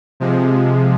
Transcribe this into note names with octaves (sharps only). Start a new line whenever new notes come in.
C3 F3 G#3